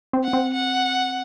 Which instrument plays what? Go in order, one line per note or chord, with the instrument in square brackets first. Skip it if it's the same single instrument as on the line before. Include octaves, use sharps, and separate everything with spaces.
[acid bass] C4
[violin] F#5
[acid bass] C4
[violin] F#5